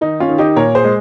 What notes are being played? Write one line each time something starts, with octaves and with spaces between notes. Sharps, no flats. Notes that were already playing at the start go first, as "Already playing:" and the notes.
D#3 D#4
C#4 F4
D#3
D#4 G4
A#2 A#4 C#5
G#4 C5
G#3